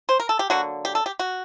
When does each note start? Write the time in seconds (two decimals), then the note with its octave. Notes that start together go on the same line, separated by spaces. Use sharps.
0.09 C5
0.20 A#4
0.29 A4
0.39 G4
0.50 D3 F#3 A#3 F#4
0.85 G4
0.95 A4
1.06 G4
1.19 F#4